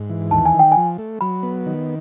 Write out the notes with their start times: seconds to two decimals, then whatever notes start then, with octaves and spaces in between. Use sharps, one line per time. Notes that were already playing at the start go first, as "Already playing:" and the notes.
Already playing: G#2
0.10 E3
0.31 D#2 A5
0.46 G#5
0.54 D#3
0.59 G5
0.72 G#5
0.77 F3
0.98 A3
1.21 F#3 B5
1.43 B3
1.66 D#3